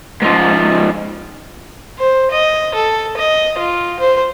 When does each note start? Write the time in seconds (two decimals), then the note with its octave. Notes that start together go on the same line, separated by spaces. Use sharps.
0.22 G#2 F3
1.99 C5
2.31 D#5
2.74 A4
3.17 D#5
3.59 F4
3.99 C5